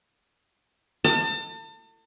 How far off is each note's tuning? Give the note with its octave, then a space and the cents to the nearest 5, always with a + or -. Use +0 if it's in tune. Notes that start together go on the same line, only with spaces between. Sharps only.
A5 +35